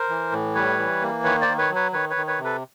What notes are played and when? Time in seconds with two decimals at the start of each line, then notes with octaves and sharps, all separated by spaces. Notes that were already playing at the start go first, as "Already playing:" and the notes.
Already playing: A#4 C5
0.09 E3
0.32 A2
0.55 G3 B4 C#5
0.78 E3
1.02 A#3
1.24 D#3 B4 C#5
1.41 C5 D5
1.48 D#3
1.58 B4 C#5
1.70 F#3
1.75 B4 C#5
1.93 D#3 B4 C#5
2.10 B4 C#5
2.16 D#3
2.27 B4 C#5
2.38 C3
2.44 A4 B4